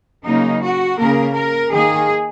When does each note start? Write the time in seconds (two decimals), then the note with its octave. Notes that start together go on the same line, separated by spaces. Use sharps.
0.23 C#3 F#3 A#3 D#4
0.61 F#4
0.97 C#3 A#3 A#4
1.34 A#4
1.70 D#3 A#3 G#4